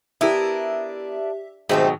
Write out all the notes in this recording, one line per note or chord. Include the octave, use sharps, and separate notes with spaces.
B3 D4 E4 G4 A#4 E5
G#2 B2 D#3 F#3 A3 C4 G4